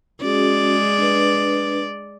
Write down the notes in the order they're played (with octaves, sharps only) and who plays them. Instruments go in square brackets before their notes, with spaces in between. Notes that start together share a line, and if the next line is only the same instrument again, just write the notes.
[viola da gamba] G#3 D5 [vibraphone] C#4 F#4 G#4
[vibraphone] D4 B4